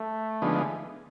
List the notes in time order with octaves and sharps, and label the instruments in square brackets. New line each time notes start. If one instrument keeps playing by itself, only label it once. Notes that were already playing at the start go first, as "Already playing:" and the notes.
Already playing: [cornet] A3
[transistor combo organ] D3 F3 G#3 B3 D#4